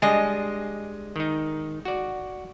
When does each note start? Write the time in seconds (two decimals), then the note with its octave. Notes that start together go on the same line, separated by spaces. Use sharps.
0.02 G3 G#3 D4 D#5
1.16 D#3 D#4
1.85 F#4 D5